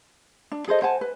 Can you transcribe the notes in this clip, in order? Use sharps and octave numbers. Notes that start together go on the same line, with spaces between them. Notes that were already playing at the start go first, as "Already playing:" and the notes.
D4
G#4 A4 C5 D#5
C5 F#5 G#5 A5
B4